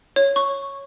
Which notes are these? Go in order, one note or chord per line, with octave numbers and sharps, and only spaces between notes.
C#5
C#6